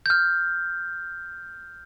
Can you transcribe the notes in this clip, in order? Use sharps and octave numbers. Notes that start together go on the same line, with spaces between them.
F6 G6